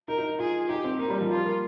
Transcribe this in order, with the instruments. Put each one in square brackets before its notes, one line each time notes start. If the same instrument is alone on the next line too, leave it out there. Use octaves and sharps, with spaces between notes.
[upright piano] D#4 [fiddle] A#4
[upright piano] D#4
[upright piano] F4 [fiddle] G#4
[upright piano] D#4 [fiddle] G4
[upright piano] C4
[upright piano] A#3 [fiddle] D#4
[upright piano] G3
F3
[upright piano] G3 [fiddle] F4
[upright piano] A#3